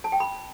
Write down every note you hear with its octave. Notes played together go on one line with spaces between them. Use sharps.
A5
G5
B5